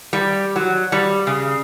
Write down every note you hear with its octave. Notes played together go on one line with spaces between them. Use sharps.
G3
F#3
G3
C#3